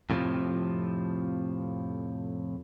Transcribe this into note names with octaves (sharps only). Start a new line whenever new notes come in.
F2 A2 C3 E3 F3